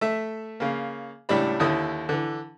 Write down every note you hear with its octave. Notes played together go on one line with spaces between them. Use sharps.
A3 E5
C#3 A#3
C#2 A2 G3 D4 B5
D#2 D3 E4 D#6
D3 E3